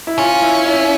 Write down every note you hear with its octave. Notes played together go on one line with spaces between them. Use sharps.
E4
C#4 F4
E4
E4